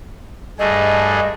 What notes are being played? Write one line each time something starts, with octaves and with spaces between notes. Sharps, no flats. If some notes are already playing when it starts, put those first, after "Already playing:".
G2 A3 G#4 D#5